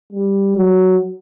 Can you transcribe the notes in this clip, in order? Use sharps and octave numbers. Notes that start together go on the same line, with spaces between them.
G3
F#3